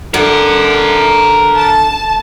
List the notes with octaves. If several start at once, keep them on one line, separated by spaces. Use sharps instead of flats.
D3 A#4 F#5
A5